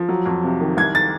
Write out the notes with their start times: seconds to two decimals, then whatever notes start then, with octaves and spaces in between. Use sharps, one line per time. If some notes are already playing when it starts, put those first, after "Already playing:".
Already playing: F3
0.09 F#3
0.26 F2
0.44 C3
0.60 D#3
0.77 C2 G#6
0.95 A6